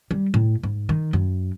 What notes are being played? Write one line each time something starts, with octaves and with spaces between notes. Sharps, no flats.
G3
A2
G#2
D#3
F#2